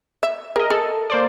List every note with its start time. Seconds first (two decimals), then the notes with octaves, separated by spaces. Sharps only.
0.23 E5
0.56 G#4 A#4 D#5
0.70 G#4 A4
1.10 A#3 C5 D5